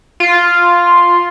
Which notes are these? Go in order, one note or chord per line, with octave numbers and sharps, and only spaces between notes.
F4